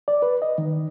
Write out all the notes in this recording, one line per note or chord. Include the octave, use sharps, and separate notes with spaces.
D5
B4
D#5
D#3